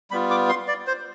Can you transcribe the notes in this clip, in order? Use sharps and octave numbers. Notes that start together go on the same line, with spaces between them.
G3 B3 F4 B5
D6
C6
D5
C5